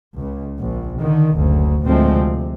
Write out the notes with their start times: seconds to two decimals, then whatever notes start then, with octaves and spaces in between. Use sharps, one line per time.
0.19 C#2
0.60 A#1
0.99 D3 D#3
1.35 F#1 D2
1.84 D2 A2 F3 G#3 A3 C4
2.14 C3